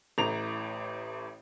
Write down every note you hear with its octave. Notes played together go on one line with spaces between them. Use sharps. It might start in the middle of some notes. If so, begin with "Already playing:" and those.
A1 A2 A#5 F7